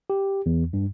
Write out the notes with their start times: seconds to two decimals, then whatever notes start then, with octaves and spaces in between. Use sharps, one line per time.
0.10 G4
0.46 E2
0.73 G2